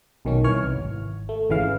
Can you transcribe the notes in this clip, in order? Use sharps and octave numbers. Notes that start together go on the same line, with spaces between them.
B1 D#3 C#4
C2 E3 C#5 F6
G#1
A3
G#1 C#3 E3 F5